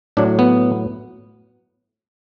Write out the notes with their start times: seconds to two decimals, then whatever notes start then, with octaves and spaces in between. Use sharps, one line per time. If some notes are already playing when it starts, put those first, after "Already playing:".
0.17 A2 F#3 D4
0.39 B3